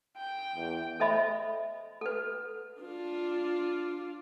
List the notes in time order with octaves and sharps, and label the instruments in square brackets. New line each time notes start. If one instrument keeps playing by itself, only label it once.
[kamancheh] G5
[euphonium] E2
[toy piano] A4 C5 D#5 E5 B5
A4 B4
[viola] D4 F4